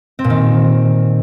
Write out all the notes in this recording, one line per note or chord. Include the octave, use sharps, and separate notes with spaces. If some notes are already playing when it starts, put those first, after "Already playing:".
C4
A#2
D#3